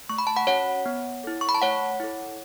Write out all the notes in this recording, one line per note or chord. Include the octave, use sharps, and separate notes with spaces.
A3 C#6
B5
A5
F#5 B5
C#4 F#4 C#5 F#5
B3
E4 A4
C#6
B5
A5
A3 C#5 F#5
E4 A4